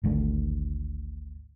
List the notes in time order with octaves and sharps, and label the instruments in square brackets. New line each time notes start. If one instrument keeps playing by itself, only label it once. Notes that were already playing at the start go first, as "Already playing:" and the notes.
[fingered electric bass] G#1 D2 A3